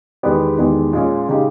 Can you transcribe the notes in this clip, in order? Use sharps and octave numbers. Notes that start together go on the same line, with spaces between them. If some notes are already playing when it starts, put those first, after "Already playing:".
E2 D#3 G#3 B3 G4
E2 D#3 G#3 D#4 G4
A#2 G#3 C#4
C#3 G#3 D#4 G4